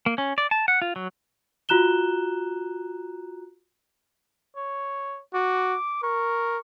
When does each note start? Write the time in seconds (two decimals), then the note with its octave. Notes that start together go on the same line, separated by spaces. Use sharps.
0.06 A#3
0.18 C#4
0.38 D5
0.51 A5
0.68 F#5
0.82 F4
0.96 F#3
1.69 F4 F#4 A#5 F#6 E7 G7
4.56 C#5
5.34 F#4 D6
6.03 A#4 C#6